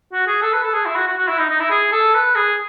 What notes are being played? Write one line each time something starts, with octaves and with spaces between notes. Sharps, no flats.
F#4
G#4
A4
B4
A4
G#4
E4
F#4
F#4
F#4
E4
D#4
D#4
E4
G#4
A4
B4
G#4